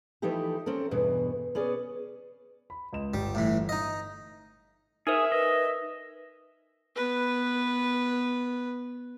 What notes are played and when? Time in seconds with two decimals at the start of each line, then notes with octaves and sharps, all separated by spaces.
0.22 E3 F3 A3 D#4 E4 G4
0.66 C4 C#4 A4 A#4
0.91 E2 G2 B2 E3
1.55 B3 C#4 G#4 D5
2.70 B5
2.93 C#2 D#5 E7
3.14 G1 G3
3.35 A2 E3
3.69 D#4 D#5
5.07 D#4 G#4 A#4 C5 E5
5.32 B4 D#5
6.96 B3 B4